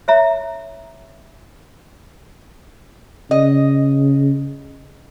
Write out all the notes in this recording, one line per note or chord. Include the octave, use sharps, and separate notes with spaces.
C#5 E5 A#5
C#3 D#5